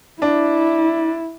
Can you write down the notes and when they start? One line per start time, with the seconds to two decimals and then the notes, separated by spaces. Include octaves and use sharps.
0.22 D4 E4